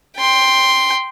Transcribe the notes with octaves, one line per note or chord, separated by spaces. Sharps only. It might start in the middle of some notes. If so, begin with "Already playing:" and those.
G5 C6